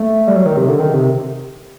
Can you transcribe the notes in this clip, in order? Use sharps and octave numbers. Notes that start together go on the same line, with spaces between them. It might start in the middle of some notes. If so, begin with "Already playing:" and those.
Already playing: A3
G3
F#3
D#3
C3
D3
D#3
C3